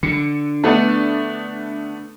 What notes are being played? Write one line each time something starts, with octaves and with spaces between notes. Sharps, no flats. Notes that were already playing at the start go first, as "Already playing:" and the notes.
D3 C#7
A3 B3 D4